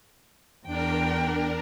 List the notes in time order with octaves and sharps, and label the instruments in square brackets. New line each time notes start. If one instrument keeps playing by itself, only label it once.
[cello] E2 G5 [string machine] D4 A#4